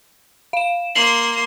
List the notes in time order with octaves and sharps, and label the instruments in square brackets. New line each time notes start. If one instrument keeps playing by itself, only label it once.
[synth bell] F5 E7
[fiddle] A#3 C6 [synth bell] C7 F#7